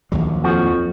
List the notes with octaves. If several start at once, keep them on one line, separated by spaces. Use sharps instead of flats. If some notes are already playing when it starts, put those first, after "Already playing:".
A#1 D#2 F#3
F2 F3 F#4